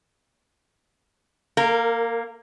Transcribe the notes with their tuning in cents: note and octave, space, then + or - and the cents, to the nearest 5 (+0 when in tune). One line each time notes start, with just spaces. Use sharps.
A#3 +0 A#4 -25